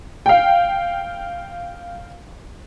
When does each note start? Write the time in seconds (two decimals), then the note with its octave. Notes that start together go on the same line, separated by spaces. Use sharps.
0.26 F5 G5